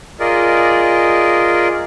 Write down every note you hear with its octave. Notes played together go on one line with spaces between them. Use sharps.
F4 G#4 A#4 D5 D#5